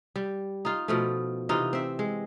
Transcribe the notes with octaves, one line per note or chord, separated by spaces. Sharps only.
G3
D#4 F4
B2 F3 A3
C3 E3 D#4 F4
C4 E5
G#3